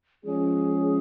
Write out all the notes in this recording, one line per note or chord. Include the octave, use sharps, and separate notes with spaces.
F3 G#3 C#4 G#4